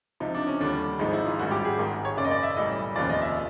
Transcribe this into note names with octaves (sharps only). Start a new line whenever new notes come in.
C#2 C3 F3 D#4
D4
C#4
D#2 D3 G3 D4
G#1 G#2 F3 G#3 D#4
E4
F4
A1 G#2 D#3 G3 F#4
G4
G#4
G#1 G#2 D#3
C#5
F#1 F#2 C#3 D5
D#5
D5
E5
B1 A2 E3 G3 D#5
F1 D#2 C#3 F3 D5
D#5
E5